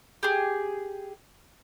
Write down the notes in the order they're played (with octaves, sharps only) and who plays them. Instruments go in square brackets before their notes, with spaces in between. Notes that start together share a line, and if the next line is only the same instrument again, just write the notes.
[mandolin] G4 G#4